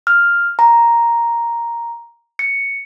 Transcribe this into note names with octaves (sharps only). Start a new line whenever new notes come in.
F6
A#5
C#7